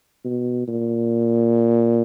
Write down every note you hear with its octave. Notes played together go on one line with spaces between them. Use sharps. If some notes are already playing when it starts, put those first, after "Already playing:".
B2
A#2